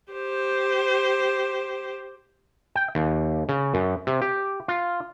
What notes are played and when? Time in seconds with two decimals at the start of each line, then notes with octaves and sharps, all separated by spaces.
0.12 G4 C5
2.75 G5
2.95 D#2
3.49 C#3
3.74 F#2
4.07 C3
4.21 G4
4.68 F4